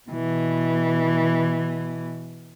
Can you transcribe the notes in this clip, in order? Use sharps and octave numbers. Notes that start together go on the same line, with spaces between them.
B2 E3